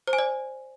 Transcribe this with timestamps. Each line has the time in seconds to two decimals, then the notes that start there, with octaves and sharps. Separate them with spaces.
0.07 C5
0.13 G#5
0.19 D5